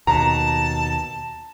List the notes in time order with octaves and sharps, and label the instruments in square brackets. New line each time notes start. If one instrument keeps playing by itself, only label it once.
[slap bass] D#2 B2 [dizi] A5 [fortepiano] A#5